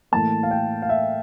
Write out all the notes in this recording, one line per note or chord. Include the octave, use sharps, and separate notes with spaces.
A2 E3 A#3 A5
F5
G5
F5
E5